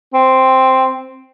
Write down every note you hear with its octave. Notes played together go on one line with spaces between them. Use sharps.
C4